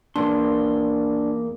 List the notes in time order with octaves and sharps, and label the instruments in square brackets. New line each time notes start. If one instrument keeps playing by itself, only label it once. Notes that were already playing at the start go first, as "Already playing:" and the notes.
[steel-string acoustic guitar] E2 [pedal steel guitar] A#3 C6 [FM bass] D4